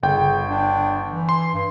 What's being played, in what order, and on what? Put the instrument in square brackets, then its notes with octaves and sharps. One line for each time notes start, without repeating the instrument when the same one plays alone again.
[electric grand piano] G1 G5 [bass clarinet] C#3
[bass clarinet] D4
E3
[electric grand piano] C6
[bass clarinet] G2